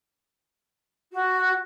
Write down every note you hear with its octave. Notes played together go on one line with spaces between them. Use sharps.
F#4